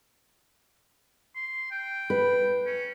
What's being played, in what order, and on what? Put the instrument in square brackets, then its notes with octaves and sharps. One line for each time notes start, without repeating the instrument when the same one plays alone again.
[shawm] C6
G5
[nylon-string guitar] B4
[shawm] C#4